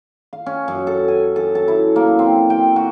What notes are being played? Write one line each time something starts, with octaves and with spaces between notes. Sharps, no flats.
F5
C#4
F#2
A4
G#5
A4
A5
E4
A#3
C4
G5
F#4